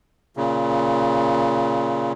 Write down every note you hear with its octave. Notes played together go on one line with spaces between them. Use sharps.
A#2 C#3